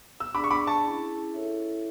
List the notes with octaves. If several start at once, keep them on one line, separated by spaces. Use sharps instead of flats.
E6
D4 G#4 D5 F#5 B5 D6
C#6
B5 D6
A5 C#6
C#4 E4 G#4
E4 A4 C#5 E5